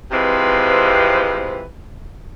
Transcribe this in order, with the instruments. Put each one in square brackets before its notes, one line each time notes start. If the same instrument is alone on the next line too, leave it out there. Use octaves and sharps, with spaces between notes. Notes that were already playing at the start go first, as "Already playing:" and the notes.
[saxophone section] C3 E3 F3 G#3 C4 B4